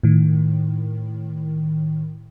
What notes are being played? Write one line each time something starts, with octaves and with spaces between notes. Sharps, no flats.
A2 D#3